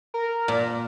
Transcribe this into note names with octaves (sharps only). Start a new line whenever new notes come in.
A#4
A#2